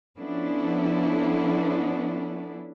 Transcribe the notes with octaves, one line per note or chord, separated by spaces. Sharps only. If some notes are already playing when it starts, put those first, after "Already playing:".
F3 B3 C#4 D4 E4 A4